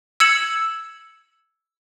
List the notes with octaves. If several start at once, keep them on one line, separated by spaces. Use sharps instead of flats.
E6 G#6 C#7 E7 F#7